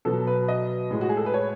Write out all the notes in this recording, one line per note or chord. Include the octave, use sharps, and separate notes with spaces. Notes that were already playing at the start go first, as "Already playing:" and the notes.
B2 F#3 A4
B4
D#5
A2 G#3
F#4
G#4
A4
B4
C#5